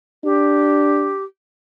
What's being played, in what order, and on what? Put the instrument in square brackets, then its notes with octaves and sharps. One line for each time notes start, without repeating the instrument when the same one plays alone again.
[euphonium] D4 [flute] G4